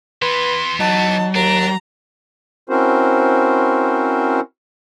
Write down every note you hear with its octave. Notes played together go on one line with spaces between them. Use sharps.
E3 B3 B4 C6
F#3 D#4 A5
D#2 D4 A#5
C4 C#4 E4 F#4 A#4 C5